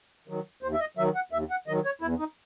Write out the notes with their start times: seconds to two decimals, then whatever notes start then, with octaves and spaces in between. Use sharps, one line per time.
0.28 D#3 F#3
0.63 D#2 C5
0.73 E5
0.80 D#5
0.97 D#3 F#3 E5
1.15 F#5
1.32 D#2 E5
1.50 F#5
1.67 D#3 F#3 D#5
1.85 C#5
2.01 E2 E4
2.19 D#4